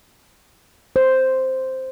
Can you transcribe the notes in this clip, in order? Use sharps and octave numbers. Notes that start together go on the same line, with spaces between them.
C5